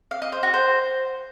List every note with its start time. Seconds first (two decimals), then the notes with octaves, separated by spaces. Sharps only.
0.11 F5
0.22 D#5
0.32 C5
0.43 F#4
0.54 C5